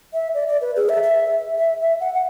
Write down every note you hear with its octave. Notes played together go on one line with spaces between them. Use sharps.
E5
D5
D5
B4
G#4
E5
E5
E5
E5
F#5
F#5